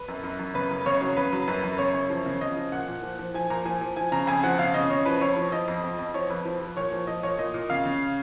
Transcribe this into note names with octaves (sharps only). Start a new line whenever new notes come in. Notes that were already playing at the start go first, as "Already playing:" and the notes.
Already playing: B4
F#2
F#2
F#2
C#3 B4
F#2
C#3 C#5
F#3 C#5
C#3 B4
F#3
F#2 B4
F#2
C#3 C#5
F#2 C#5
F3
C#3
C#3 D#5
F3
A#2 F#5
A#2
F3
F3
F3 G#5
A#2 A#5
F3 G#5
F3
F3 G#5
C#3 A#5
F2 G#5
F3 F#5
C#3 F5
C#3 D#5
C#3 C#5
F3 B4
F2 C#5
F3
F3 D#5
F2
F2
F2
F3 C#5
F2 B4
F3
F3
A#2 C#5
F3
F3 D#5
A#2 C#5
A#2 D#5
A#2
C#3 F5
C#3